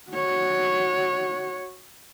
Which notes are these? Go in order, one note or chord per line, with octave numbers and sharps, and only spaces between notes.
F#4 C#5